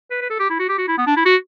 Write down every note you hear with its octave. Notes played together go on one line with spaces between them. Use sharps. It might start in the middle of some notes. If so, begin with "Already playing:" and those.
B4
B4
A4
G4
E4
F#4
G4
F#4
E4
B3
D4
E4
F#4